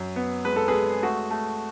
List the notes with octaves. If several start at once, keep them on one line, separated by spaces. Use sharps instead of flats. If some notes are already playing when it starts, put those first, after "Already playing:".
Already playing: F#2
B3
G#3 B4
A4
G#4 B4
G#3
A3 F#4
A3